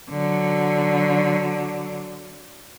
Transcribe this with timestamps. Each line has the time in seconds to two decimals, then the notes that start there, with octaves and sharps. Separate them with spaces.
0.10 D3 F#3